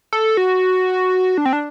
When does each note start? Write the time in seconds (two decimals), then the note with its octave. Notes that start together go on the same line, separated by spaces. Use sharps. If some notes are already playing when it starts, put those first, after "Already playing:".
0.13 A4
0.37 F#4
1.38 D4
1.45 C4
1.53 D4